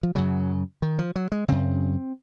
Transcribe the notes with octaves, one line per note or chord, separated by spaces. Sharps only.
F3
F#2 C#3 F#3
D#3
F3
F#3
G#3
F#2 C#3 C4